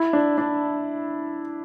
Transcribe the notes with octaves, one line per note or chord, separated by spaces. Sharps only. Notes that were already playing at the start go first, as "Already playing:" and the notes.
Already playing: E4
D4
D4